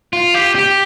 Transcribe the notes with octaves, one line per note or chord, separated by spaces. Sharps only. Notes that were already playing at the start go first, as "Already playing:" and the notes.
F4
G4
G4